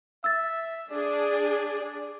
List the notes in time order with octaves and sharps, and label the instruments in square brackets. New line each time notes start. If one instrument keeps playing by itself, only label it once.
[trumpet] E5 [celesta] E6 A6
[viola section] D4 G#4 [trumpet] D5